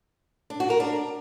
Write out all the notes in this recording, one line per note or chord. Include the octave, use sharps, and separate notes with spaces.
D4
F#4
A#4
D4